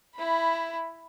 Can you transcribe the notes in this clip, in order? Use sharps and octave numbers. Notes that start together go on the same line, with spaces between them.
E4 B5